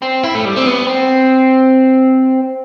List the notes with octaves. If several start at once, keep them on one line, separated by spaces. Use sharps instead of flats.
C4
E4
A3
G3
C4
B3
C4